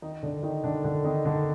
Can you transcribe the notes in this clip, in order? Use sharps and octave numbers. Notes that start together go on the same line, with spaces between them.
D#3 D#4
D3 D4
D#3 D#4
D3 D4
D3 D4
D#3 D#4
D3 D4